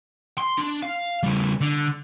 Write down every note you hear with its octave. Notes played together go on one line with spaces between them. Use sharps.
C6
D4
F5
C#3 G3
D3